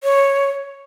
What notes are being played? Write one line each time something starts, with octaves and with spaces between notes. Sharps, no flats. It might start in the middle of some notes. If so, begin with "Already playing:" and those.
C#5